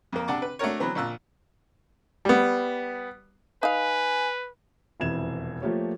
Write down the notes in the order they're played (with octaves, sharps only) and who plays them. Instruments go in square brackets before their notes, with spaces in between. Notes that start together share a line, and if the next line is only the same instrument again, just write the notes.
[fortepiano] F2 A#3
C3 D4 F#5 A5 D6
B4
A3 D4 F#4 A#4 C#5
E3 F#3 B3 C4
A#1 A#2 E6 F#6
G3 B3
[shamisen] D#4 F5 [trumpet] B4 [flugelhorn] G#5
[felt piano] E1 F2 C3 E3 G#6 E7
F3 A3 A#3 F4 G4 C#5